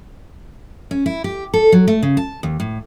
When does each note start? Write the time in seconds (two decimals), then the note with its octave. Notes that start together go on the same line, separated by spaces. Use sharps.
0.91 C#4
1.06 E4
1.24 G4
1.54 A4
1.72 F#3
1.88 A3
2.03 C#3
2.17 A5
2.43 D#2
2.60 A2